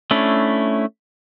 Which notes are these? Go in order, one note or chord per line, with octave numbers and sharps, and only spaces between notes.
A3 C#4 D4 E4